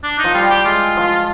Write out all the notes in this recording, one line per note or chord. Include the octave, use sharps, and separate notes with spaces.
D4
D#4
F3
G3 F4
G4
G#3 F4
F3